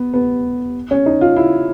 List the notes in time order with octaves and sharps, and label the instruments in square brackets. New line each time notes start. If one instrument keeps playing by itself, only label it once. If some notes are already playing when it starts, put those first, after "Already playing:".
Already playing: [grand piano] B3
B3
C#4
D#4
F4
E4